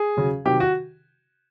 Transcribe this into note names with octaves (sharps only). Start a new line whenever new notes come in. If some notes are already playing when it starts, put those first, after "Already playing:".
Already playing: G#4
C#3 F#3
C3 D#3 F#3 G4
F#4